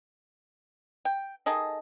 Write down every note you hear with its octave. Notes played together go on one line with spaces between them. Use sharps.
G5
D#3 G#4 A4 D#5